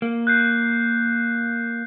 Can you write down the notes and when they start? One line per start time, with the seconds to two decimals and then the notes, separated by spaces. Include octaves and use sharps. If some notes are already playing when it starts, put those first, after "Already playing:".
0.02 A#3
0.27 F#6 G6 C7